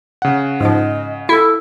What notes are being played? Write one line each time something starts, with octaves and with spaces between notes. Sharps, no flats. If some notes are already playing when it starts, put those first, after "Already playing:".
C#3 F#5
G#2 F3 D#5
E4 A4